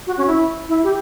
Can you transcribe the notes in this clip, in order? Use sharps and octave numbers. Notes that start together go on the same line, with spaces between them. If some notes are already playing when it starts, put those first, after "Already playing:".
F#4
C#4
E4
E4
G4